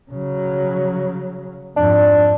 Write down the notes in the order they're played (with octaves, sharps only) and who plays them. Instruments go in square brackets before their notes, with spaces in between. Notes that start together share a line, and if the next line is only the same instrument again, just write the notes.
[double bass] C#3 F#3
[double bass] F2 G#2 [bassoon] D4